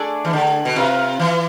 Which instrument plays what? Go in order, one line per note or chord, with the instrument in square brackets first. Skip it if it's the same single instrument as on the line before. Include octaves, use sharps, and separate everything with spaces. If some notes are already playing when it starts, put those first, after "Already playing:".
Already playing: [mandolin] A3 D4 G#4 D5
[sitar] E3
D3
B2
[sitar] C3 [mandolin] F4 B4 F5
[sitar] E3